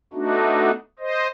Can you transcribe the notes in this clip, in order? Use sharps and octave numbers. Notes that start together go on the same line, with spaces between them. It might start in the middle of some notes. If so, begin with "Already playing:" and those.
A3 B3 D4 D#4 F#4
C5 D#5